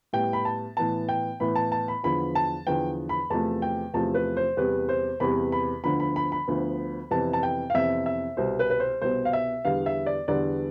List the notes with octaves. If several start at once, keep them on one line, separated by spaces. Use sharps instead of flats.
A2 G3 B3 G5
B5
A5
A2 E3 B3 A5
G5
A2 E3 B3 B5
A5
A5
B5
E2 D3 F3 B3 B5
A5
E2 D3 F3 B3 G5
B5
E2 C3 F3 A3 A5
G5
E2 C3 F3 A3 A5
B4
C5
E2 C3 G3 B3 B4
C5
E2 C3 G3 B3 B5
B5
D2 D3 F3 B3 B5
B5
B5
B5
D2 D3 F3 B3
F2 C3 E3 B3 A5
A5
G5
F5
F2 C3 E3 B3 E5
E5
C2 B2 B3 C5
B4
B4
C5
C2 B2 B3 C5
F5
E5
E2 D3 G3 B3 F5
E5
D5
E2 D3 G3 B3 D5